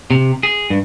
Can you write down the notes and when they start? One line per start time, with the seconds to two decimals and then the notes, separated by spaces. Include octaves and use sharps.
0.11 C3
0.43 G#4
0.70 G2